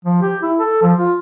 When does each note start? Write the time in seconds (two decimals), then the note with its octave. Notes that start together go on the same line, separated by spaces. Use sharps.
0.05 F3
0.22 G4
0.42 E4
0.59 A4
0.83 F3
0.98 F4